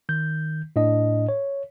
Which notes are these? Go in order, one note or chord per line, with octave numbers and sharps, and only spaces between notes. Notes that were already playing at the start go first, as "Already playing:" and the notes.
D#3 G6
A2 D4 D#5
C#5